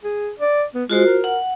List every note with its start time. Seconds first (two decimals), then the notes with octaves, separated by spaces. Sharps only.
0.04 G#4
0.40 D5
0.74 B3
0.90 G#3 F4 F#4 C5
1.06 A#4
1.24 F#5